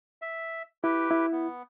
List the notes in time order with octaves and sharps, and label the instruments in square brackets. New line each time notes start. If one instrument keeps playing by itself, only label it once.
[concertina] E5
[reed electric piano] E4 [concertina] G4 B4 G5
[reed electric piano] E4
[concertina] B3